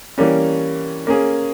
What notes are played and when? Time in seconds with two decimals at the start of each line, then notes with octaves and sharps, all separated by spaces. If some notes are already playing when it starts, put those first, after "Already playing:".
0.18 E3 G3 A#3 C#4
1.07 A#3 C#4 G#4